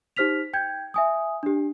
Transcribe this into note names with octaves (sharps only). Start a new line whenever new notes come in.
D#4 G4 C5 F6 B6 F7
G5 G6 G#6
E5 G#5 D#6
D4 G4